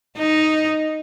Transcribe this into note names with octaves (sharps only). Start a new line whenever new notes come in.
D#4